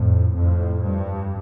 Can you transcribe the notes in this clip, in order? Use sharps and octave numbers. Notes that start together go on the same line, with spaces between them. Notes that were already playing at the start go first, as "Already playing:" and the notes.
Already playing: F2 A2
F2 A2
G2